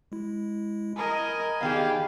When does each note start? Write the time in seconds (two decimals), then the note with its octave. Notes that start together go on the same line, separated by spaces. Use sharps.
0.12 G#3 E4
0.96 A#4 D#5 G#5 B5 G#6
1.61 E2 D#3 G4 G#4 F5